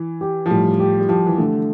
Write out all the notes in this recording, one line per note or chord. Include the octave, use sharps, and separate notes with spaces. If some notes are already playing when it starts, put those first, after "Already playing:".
Already playing: E3
G4
F3
A2 G3
G4
G3
F3 G4
E3
D3 A3